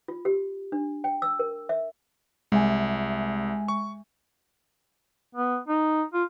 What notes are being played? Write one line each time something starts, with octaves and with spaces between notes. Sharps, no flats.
F4
G4
D4
G5
E6
A#4
E5
C2 G#3 E5 G#5
C#6
B3
D#4
F4